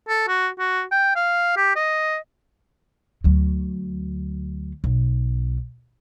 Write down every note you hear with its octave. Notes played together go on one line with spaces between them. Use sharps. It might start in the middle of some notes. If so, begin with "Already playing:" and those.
A4
F#4
F#4
G5
F5
G4
D#5
D2 F#3
B1